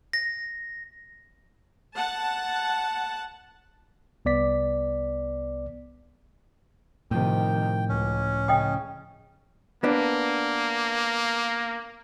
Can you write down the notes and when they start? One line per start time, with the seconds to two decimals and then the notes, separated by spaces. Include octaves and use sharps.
0.13 A#6
1.95 F#5 A5
4.25 C2 B3 D5 B6
7.11 A2 C3 D#3 F3 G5
7.89 C#2 C#4
8.48 C#3 D#5 G5 D#6
9.84 A#3 B3 D4